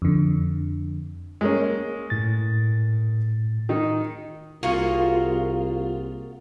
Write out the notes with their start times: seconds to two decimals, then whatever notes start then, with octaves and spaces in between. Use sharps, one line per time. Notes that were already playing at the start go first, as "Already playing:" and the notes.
0.02 F2 D3
1.41 G#3 A#3 C#4
2.10 A2 A6
3.69 D#3 D#4
4.63 C2 A#3 F4 F#4 G#4